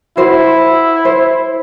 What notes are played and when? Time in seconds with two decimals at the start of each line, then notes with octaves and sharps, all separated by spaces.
0.17 E4 F#4 C5
1.05 C5